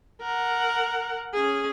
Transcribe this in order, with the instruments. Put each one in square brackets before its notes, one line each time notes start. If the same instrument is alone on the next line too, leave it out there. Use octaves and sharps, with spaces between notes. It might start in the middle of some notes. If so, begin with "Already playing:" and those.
[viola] A#4 F#5
C#4 G#4